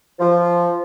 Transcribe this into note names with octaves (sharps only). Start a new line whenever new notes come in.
F3